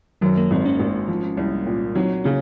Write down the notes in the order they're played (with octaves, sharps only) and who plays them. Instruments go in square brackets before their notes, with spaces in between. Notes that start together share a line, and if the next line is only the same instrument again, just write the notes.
[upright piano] F#2 [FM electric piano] D#3 F#3
[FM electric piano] A#3
[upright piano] G#1 [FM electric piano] C4
[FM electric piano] A#3 C#4
[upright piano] G#1
F3
C2
A#2
[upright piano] F#3 [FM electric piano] C4 D#4
[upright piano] C#3 [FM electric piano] A#3 C#4